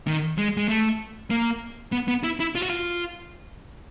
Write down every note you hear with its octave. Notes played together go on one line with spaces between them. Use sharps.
D#3
G#3
G#3
A3
A#3
B3
B3
E4
E4
F4
F#4
F4